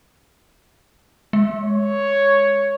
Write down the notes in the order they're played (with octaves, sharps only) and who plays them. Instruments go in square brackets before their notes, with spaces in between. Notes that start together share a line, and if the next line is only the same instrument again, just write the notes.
[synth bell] G#3
[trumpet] C#5